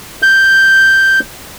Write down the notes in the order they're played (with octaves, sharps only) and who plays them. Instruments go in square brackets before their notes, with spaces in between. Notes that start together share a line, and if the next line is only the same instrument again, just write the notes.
[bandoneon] G6